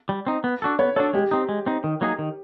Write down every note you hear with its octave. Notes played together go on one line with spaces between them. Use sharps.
G3
C4 D#4
B3
D4 F#4 A4
B3 C#5
D4 F#4 A4 C#5
G#3 G4
C4 D#4
G#3
C4 D#4
D#3
F#3 A#3 D#4 G#4
D#3